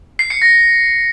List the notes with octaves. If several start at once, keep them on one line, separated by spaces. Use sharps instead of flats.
C7
C#7
A#6